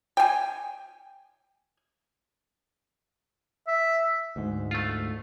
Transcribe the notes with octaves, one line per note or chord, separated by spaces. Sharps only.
G5 G#5
E5
D2 G#2
A3 F4